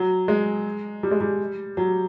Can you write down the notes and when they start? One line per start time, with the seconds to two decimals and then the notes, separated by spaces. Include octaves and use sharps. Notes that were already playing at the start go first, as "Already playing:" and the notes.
Already playing: F#3
0.28 G#3
1.03 G3
1.11 G#3
1.21 G3
1.77 F#3